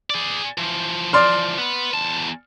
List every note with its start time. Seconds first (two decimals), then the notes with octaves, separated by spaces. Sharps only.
0.10 G#4 D5
0.58 E3 F3
1.13 D5 C6 F6
1.58 B3 B4
1.94 E2 A5